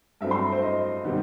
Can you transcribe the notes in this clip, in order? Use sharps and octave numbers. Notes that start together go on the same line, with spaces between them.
G2 F#3 A3 C4 E5
C6
C5
D#5
C3 D#3 G3 B3